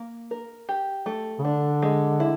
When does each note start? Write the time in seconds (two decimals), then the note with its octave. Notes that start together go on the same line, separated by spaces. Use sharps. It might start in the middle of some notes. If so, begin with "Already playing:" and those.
Already playing: A#3
0.31 A#4
0.69 G4
1.06 A3
1.39 C#3
1.44 D3 D4
1.82 G#3
2.20 E4